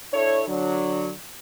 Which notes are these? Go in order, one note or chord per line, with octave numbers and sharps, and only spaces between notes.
D4 E4 A4 C#5
D3 F#3 D4